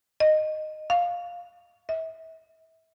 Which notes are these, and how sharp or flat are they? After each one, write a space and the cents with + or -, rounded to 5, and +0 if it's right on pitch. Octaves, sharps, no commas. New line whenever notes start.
D#5 -10
F5 +10
E5 -30